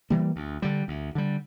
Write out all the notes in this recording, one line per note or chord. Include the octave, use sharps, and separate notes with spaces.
E3 G3 A#3
D2
D3 G3
D2
D3 G3